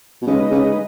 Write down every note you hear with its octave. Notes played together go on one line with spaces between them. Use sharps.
B2
C#3 G#3 D#4 B4 D#5
C#3